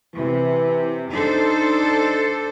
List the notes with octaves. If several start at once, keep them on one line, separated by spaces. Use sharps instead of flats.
C3 E3
D4 D#4 A4 C5